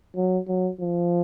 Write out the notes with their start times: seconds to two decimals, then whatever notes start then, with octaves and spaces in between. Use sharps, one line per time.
0.16 F#3
0.48 F#3
0.80 F3